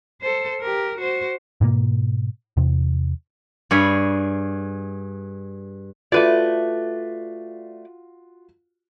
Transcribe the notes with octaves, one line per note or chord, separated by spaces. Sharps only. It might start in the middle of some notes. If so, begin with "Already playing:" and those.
A4 C5
G4 A#4
F#4 C5
G#2 B2 A#3
E2 C3
G2 G#4 C#5 B5
A3 F4 F#4 B4 D5